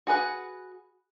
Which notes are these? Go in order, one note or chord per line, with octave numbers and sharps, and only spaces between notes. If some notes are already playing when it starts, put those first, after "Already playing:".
F#4 G#4 B4 F#5